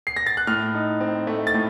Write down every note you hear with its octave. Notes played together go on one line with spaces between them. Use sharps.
C7
A#6
A6
F#6
A2 F6
D#4
C4
A3
A6
A2